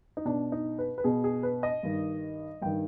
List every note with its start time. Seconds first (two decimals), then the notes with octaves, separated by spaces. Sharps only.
0.17 D#4
0.25 B2 D4
0.52 D#4
0.79 B4
0.98 B4
1.04 B2 G#4
1.24 G#4
1.43 B4
1.63 D#5
1.83 G2 D#3
2.62 G2 D#3 G5